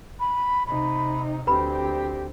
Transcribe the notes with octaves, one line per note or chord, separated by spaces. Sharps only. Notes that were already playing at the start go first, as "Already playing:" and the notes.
B5
C3 D#4 B5
D2 C4 G4 B4 B5